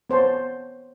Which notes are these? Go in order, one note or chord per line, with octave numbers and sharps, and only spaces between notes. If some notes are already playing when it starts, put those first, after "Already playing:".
B3 C5 C#5 A5